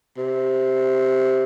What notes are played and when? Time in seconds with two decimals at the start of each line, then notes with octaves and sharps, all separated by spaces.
0.17 C3